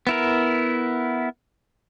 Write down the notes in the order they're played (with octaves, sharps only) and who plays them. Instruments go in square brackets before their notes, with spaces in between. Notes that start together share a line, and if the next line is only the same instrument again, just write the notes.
[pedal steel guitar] B3 E4 A#4